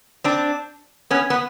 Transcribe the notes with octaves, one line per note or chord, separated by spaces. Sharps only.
C4 D4
B3 C#4
B3